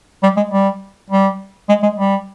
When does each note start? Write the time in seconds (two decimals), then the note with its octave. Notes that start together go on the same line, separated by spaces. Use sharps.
0.23 G3
0.36 G#3
0.51 G3
1.10 G3
1.69 G#3
1.83 G#3
1.98 G3